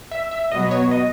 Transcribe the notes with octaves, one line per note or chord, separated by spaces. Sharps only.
E5
E5
B2 F#3 B3 F#4 D#5
C#5
D#5